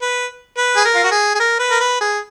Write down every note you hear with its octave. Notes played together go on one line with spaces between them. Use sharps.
B4
B4
G#4
A#4
F4
F#4
G#4
G#4
A#4
B4
A#4
B4
G#4